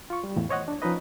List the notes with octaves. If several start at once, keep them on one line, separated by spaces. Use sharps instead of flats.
F4 C#6
G3
E2 A2
C5 C#5 D#5 F#5
D4
F3 C#4 D#4 B4 D#5